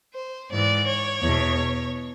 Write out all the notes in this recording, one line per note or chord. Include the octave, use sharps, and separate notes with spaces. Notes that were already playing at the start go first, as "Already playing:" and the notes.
C5
G#2 E3 D5
C#5
E2 B2